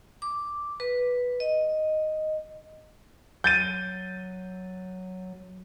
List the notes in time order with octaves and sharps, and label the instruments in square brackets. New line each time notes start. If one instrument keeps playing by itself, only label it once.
[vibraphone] D6
B4
D#5
[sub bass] F#3 [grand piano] G6 A6 D#7